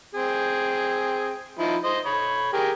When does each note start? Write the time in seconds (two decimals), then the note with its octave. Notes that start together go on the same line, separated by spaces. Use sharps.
0.15 C4 G#4
1.59 F3 D#4 E4
1.84 C5 D#5
2.06 C#5 B5
2.53 G4 G#4 A#4